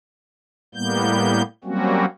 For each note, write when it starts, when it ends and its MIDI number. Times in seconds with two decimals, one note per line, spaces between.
0.75 1.42 45
0.75 1.42 55
0.75 1.42 58
0.75 1.42 59
0.75 1.42 91
1.64 2.05 54
1.64 2.05 55
1.64 2.05 58
1.64 2.05 60
1.64 2.05 61
1.64 2.05 66